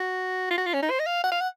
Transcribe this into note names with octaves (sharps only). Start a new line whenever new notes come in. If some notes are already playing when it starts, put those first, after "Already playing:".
Already playing: F#4
F4
F#4
F4
C#4
D#4
C5
D#5
F5
F#5
F5
F#5